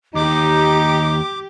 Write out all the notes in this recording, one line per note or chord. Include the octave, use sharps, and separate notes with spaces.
D#2 D#4 G4 D6